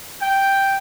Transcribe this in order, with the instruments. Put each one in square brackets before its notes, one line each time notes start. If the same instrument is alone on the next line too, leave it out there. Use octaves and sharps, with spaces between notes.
[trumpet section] G5